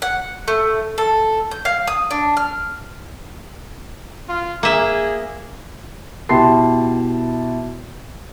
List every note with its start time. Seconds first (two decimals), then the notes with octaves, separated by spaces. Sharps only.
0.02 F#5
0.48 A3
0.98 A4
1.51 G6
1.65 F5
1.87 D#6
2.11 D4
2.37 F6
4.29 F4
4.63 A#3 G#4 E5
6.29 B2 E4 G4 A5 C6 C7